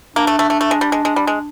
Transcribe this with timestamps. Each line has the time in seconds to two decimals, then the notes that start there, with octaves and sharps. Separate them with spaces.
0.16 A#3 D4
0.27 A3
0.39 A3
0.50 A3
0.61 A3
0.71 G#3
0.81 G3
0.92 G#3
1.05 G#3
1.16 G3
1.27 G#3